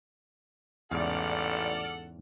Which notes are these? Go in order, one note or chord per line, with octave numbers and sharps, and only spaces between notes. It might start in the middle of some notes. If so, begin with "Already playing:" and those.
A1 E2 G#2 C#3 A4 D5 F#5 F6